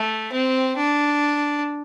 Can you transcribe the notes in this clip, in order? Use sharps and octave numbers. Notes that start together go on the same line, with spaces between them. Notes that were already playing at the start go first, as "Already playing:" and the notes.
Already playing: A3
C4
D4